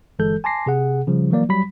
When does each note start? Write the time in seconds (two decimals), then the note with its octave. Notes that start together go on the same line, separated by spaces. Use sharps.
0.19 G1 E3 G#3 A4 G6
0.44 G#5 A5 C6 D6 A#6 C7
0.66 C3 G#4 F#5
1.07 C#3 F3 G3
1.31 E3 F#3 A#3 D5
1.49 F#3 G3 B5 B6